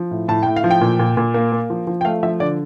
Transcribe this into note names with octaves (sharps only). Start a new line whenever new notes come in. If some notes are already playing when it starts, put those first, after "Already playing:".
Already playing: F3
A2
A2 A5
A2 G5
F5
F3
G5
A#2
A#2
A#2
A#3
A#3
F3
F3
G5
A3 F5
F3 E5
D3 D5